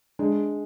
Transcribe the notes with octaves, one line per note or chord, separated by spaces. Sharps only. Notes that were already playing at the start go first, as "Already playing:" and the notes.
G#3 D4